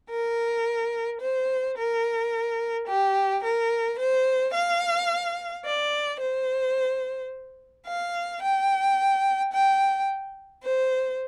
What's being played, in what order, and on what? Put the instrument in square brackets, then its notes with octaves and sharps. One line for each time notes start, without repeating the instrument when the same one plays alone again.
[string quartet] A#4
C5
A#4
G4
A#4
C5
F5
D5
C5
F5
G5
G5
C5